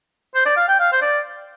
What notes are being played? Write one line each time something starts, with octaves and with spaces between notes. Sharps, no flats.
C5
D5
F5
G5
F5
C5
D5